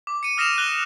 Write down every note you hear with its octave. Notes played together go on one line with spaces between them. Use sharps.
D6
C#7 D#7
D#6 F6 A#6 C7 E7 F7
F#6 F7 G7